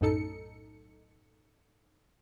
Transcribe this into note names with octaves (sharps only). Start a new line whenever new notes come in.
B1 F#2 A2 D#4 A4 C#7